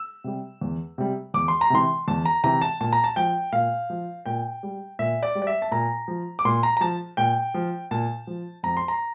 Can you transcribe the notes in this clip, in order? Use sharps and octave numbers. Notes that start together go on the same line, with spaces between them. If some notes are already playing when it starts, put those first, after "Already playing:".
Already playing: E6
C3 G3
E2
C3 G3
E2 D6
C6
A#5
C3 E3 C6
E2 A5
A#5
C3 E3 A#5
A5
A#2 A5
A#5
A5
F3 G5
A#2 F5
F3
A#2 G5
G3
A#2 E5
D5
G3
D5
E5
A5
A#2 A#5
F3
D6
A#2 C6
A#5
A#5
F3 A5
A#2 G5
F3
A#2 A5
F3
F2 A#5
C6
A#5